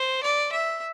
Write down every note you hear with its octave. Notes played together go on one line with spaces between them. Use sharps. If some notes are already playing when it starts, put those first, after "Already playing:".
Already playing: C5
D5
E5